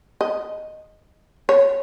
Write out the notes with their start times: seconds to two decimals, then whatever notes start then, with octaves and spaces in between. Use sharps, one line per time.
0.21 D#5
1.49 C#5